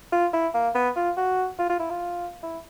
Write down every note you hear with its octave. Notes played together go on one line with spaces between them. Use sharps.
F4
E4
A#3
B3
F4
F#4
F4
F4
E4
F4
E4